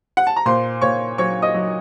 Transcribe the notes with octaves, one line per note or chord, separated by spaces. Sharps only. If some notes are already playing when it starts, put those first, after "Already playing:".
F#5
A5
A#5
A#2 C5 C6
A#2 C#5 C#6
F#3 C#5 C#6
D#5 D#6
F#3